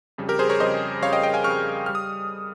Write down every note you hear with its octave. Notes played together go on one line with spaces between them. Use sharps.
F2 C#3 G3
G4 A#4
G#4 C5
A#4 C#5
F2 C#3 G3 C5 D#5
F2 C#3 G3 C#5 F5
D#5 G5
D#5 G5
F5 G#5
F2 C#3 G3 C#6 F6
G3 F6
D#6